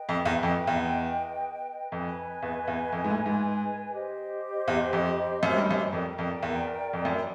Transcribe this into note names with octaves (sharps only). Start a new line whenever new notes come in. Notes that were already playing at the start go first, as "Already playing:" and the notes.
Already playing: B4 D#5 G5
F2
E2
F2
E2
F2 B4 D#5 G#5
E2
E2
F2
G#2
A2
G#2
G4 C5 D#5
E2
F2
F#2
G2
F#2
F2 A#4 D5 G5
F2
E2
F2
F#2